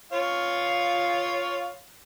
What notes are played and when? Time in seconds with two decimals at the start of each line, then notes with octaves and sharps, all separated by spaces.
0.12 F4 C#5 F5